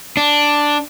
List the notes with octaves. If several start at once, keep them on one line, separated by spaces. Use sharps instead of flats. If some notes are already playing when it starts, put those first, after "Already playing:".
D4